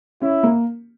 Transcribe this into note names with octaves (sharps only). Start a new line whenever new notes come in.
C#4 E4
A#3